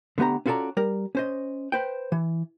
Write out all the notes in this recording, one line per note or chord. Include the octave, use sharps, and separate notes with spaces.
D3 A3 B3 G4 A#5
C#4 F4 F#4 A4 D5 A#5
G3 A#4
C#4 C5 D#5
B4 C5 G5
E3